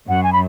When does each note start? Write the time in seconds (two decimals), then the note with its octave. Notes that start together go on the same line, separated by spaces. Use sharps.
0.08 F#2 F#5
0.23 G#5
0.33 B5